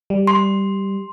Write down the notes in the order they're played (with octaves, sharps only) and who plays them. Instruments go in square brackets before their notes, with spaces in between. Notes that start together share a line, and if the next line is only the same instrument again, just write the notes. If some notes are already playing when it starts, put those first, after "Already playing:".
[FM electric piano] G3
[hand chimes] C6